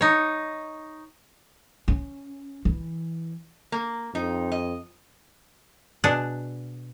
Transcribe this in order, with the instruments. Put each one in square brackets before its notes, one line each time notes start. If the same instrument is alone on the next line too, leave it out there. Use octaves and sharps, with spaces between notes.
[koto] D#4 C#5
[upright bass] C#4
E3
[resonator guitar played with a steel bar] A#3
[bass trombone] F2 [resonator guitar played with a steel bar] D#4
[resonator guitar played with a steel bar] D#5
[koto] B2 D4 G#4 F#5